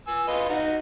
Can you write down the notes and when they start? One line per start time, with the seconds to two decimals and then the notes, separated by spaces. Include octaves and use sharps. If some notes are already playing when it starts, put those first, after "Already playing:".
0.08 G#5 E6
0.28 F4 B4 D#5
0.49 D#4 F#4